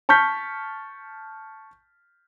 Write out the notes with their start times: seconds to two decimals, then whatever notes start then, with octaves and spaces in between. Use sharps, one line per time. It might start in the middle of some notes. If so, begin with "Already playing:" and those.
0.09 A5 C#6 F6 G6 B6